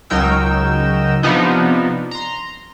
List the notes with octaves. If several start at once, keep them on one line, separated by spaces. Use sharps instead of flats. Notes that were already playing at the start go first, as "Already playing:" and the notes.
C#2 F#3 D#4 A#4 G5 E6
C3 F3 B3 D4 D#4
A#5 C6